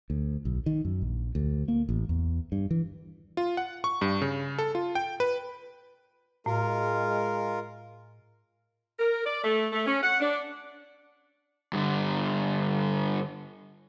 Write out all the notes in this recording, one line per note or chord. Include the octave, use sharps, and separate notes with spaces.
D2
B1
D#3
F#2
A#1
D2
A#3
A1
E2
G2
E3
F4
F#5
C#6
G2
C#3
A4
F4
G5
B4
A2 G#3 F4 A#4
A#4
D5
A3
A3
C#4
F#5
D4
G2 D3